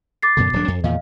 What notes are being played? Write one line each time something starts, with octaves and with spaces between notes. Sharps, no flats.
D6 A6 C7
F#2 B2 D3
D1 F#3 D4
F2
E2 A#2 D#3 D#5 F5